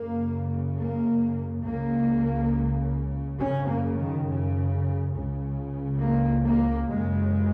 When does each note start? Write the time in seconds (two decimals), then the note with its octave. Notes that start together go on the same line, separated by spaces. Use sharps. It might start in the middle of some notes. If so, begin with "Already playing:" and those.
Already playing: F#2 C#3 A#3
0.77 A#3
1.64 C#2 C#3 A#3
3.39 F#2 C#3 C#4
3.68 A#3
3.97 D#3
4.26 C#3
5.13 C#2 C#3
6.01 A#3
6.45 A#3
6.88 F#2 C#3 G#3